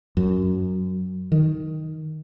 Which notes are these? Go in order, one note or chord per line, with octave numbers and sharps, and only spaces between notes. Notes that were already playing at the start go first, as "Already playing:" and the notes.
F#2
D#3